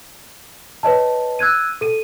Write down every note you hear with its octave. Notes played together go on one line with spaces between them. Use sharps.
B4 C#5 D#5 A5
E6 F#6 G#6 D#7
A4 D#7